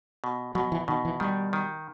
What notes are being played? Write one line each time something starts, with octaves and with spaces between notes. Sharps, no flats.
B2
B2 F#3
E3
B2 D#3
E3
D#3 G3
D#3